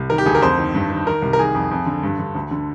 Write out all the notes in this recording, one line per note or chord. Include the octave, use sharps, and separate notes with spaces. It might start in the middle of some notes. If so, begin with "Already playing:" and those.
Already playing: C2
D#3 A#4
G4
D2 G#4
A#4
F2 C5
D#3
G2
D#3
D#3 A#4
C2
A#4
D#3 G#4
F2
F2
D3
G2
D3
D2
D3